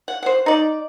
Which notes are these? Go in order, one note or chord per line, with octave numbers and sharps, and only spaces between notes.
F#5
C5 F#5
D#4 D5